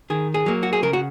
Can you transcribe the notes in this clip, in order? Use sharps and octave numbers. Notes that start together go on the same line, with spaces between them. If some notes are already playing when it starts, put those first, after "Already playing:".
D#3 G#4
G#4
F#3 A#3
F#4
G#4
C#3 A#4
F#4